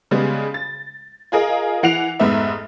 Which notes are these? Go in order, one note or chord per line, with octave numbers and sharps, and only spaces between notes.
C#3 G3 G#3 B3
A6
F4 G#4 A#4 D#5
E3 F#5 C7 D7 F7
F1 G#2 B3 E5